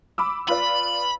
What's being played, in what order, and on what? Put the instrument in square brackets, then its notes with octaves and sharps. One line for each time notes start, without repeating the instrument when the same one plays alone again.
[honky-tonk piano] B5 D6 E6
[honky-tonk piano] F4 B4 D5 [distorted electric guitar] B5